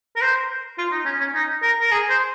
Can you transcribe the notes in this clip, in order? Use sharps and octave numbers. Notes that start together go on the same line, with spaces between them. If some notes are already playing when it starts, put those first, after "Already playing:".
A#4
C5
F4
D#4
C#4
C#4
D#4
A#4
A#4
G#4
C5